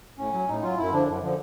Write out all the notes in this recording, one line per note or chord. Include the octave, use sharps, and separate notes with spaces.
A2 C#4
F#3
A2 D#4
F#3 F4
F#2 E4
D3 F3 D4
F#2
D3 F3